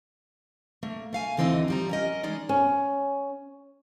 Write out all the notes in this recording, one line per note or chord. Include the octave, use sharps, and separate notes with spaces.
A3 A#3
A3 F5 G#5
D#2 D3 E3 C4 D#4 D#5
F3 G3 A#5
C#4 A#4 D#5
E3 G#3 D#4 D5
C#4